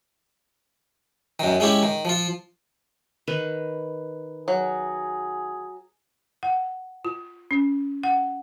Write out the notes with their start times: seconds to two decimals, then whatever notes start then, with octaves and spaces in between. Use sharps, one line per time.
1.39 F#2 D#3
1.60 G#3 C#4 E4 G4
1.83 D#3
2.05 F3 F4
3.28 D#3 B4
4.48 F#3 G#4
6.43 F#5
7.05 F4
7.51 C#4
8.03 F#5